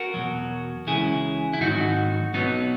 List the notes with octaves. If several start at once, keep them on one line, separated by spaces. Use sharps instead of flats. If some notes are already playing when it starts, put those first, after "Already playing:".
Already playing: F#4 A#4
E2 B2 F#3
C#2 C#3 E3 E4 G#4
E4
G#2 D#3 F#3 D#4 F#4
B1 B2 F#3 B3 D#4